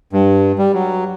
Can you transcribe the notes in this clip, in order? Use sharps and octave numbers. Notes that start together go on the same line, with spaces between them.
G2
G3
F#3